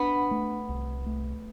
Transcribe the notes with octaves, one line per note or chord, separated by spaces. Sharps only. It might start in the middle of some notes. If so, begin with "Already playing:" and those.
Already playing: B3 D4
A3
C2
A3